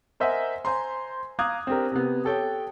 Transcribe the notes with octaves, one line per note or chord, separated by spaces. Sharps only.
A#4 C5 D#5 E5 F#5 G#5
C5 G#5 A#5 C6
F5 A#5 D6 D#6 F#6 G#6
C4 D4 G4 A#4
C3 B3
G4 A4 C#5 G5